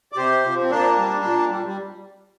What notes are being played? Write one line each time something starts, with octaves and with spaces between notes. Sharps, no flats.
D5
C3 G4 C5
F3
C4
A#2 A#3 D4
G3
A#2
G3
G3